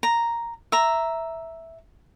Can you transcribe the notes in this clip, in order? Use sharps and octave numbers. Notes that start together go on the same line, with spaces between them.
A#5
E5 A#5